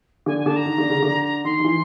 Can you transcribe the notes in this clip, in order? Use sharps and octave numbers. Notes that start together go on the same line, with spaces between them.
D3 G#5
G#5
D3 A5
A#5
D#3
D3
C#3
D3
D#3 C6
D#3
E3